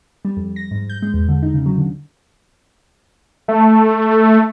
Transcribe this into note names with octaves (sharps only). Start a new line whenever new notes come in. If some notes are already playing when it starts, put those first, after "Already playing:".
G3
F2
A#6
G#2
G6
G#3
E2
D3
D#4
C#3
F#3
D3
A3